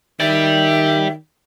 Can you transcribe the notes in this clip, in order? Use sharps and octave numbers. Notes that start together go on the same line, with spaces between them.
D#3 G4 D5 E5